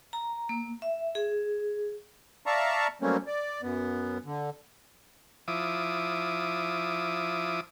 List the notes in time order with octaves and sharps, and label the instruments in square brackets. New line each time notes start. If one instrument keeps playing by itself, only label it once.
[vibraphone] A#5
A#3
E5
G#4
[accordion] D5 E5 F5 A5 A#5 C#6
F#3 G3 A3 A#3 C4 C#4
D5
F#2 B3
D3
[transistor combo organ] F3 E4 D6 D#6